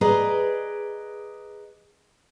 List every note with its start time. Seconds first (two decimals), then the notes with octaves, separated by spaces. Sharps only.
0.01 G#4 B4 D5 D#5 A#5